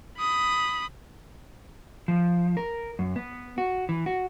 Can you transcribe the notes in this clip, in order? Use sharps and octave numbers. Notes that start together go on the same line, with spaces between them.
B5 D#6
F3
A#4
F#2
B3
F#4
E3
F#4